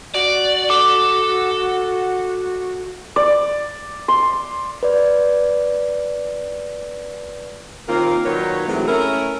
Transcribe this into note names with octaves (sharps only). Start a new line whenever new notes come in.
F#4 D5
A4 D6
D5
C6
B4 D5
D#2 D#3 A#3 C4 F4 A#4
A#2 D#3 F#3 B4 C#5
C3 E3 F#3 G#3 A3
A3 C#4 E4 A#4